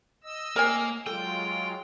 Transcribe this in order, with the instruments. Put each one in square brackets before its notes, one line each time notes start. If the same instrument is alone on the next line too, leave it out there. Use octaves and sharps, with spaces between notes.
[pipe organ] D#5 E6
[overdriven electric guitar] A#3 [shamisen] A#4 C#5 G#5
[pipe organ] F#3 G#3 F4 [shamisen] A4 [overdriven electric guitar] G5